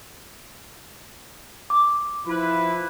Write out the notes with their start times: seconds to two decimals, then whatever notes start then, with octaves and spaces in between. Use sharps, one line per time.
1.70 D6
2.26 F3 E4 B4